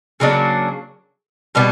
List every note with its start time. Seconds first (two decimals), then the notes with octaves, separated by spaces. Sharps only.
0.20 C#3 F#3 A#3 D4
1.55 B2 G3 B3